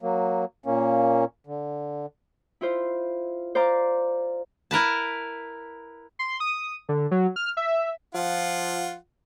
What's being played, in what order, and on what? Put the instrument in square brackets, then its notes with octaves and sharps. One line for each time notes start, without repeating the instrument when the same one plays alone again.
[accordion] F#3 A#3
A#2 A#3 C#4
D3
[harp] E4 F4 C5
C5 D5 F5 A#5 C6 D6
[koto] E4 A#4 B4 A5
[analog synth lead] C6
D#6
D3
F#3
F6
E5
[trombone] F3 [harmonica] F4 F#5